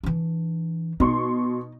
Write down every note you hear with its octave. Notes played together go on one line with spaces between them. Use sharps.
E3 D4
B2 D#4 C6 C#6